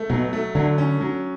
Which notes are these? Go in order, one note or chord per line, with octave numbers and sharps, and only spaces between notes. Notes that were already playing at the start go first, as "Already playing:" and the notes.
Already playing: A3
B2 F#3
A3
D3 F#3
C#4
F#3